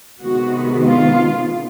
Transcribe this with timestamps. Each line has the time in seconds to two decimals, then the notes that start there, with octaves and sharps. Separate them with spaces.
0.21 C3 D#3 G#3 B3 F#4
0.86 F4